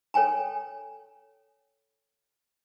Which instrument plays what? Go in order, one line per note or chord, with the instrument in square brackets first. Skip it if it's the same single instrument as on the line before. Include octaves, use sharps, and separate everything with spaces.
[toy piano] A4 C#5 G5 G#5 A#5